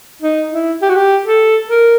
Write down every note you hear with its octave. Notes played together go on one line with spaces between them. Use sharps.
D#4
E4
G4
F#4
G4
A4
A#4